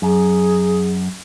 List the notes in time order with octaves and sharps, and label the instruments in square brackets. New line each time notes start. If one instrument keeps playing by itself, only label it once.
[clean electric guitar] F#2 [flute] G#4